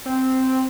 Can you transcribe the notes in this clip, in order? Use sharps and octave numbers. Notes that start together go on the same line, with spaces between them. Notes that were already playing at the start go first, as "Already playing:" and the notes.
C4